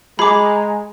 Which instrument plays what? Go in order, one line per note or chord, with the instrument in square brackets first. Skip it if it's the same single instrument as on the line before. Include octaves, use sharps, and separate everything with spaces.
[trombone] G#3 [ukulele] G#4 [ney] A#5 [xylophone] B5 D6